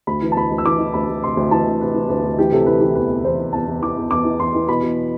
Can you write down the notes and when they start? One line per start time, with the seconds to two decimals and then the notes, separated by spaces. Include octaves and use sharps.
0.07 D2 B5
0.22 E3
0.32 A5
0.36 D2 B5
0.51 D2
0.58 E6
0.65 E3 D6
0.79 E3
0.94 D2 B5
1.08 D2
1.23 C3 C6
1.37 D2
1.51 E3 A5
1.66 D2
1.81 C3 B4
1.94 E3
2.09 D2 B4
2.23 D2
2.39 E3 G4
2.52 C3 A4
2.66 E3 B4
2.81 E3 G4
2.95 E2 B4
3.09 E2
3.24 E2 C5
3.39 E2
3.53 E2 A5
3.67 E2
3.82 E3 D6
3.97 E2
4.11 E2 D6
4.25 E3
4.39 E2 C6
4.55 E3
4.68 B2 B5
4.82 B2